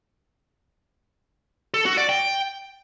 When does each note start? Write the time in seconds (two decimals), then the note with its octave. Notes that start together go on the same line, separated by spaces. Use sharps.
1.74 A4
1.86 F#4
1.97 D5
2.09 G5